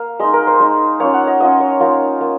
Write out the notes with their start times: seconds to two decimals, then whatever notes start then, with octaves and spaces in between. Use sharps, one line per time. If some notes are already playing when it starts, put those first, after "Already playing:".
Already playing: A#3 F5
0.19 G#3 D#4 D#5
0.34 A#4
0.47 C5
0.60 G#3 D#4
1.00 A#3 C#4 F4 C#5
1.14 F#5
1.27 D#5
1.40 A#3 C#4 F4 D#5
1.60 C#5
1.80 A#3 D#4 F4
2.21 A#3